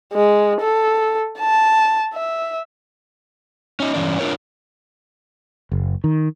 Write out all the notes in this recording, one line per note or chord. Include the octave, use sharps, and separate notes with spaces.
G#3
A4
A5
E5
C#4 D#4
G2 E3 C#4 D5
D4 F4 A#4 C#5
F#1
D#3